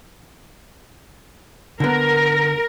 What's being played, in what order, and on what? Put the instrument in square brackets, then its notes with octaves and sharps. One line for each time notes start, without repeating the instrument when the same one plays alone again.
[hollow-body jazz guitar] D3 B3 [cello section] A#4